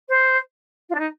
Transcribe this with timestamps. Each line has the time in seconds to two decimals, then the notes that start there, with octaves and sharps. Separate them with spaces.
0.08 C5
0.89 F4
0.94 D4
0.99 D#4